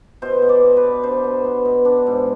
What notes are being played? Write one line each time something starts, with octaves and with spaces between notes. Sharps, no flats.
B2 C5
B2
D5
B2
B4
B3
D4 C5
B3
B3
B2
D4
G#2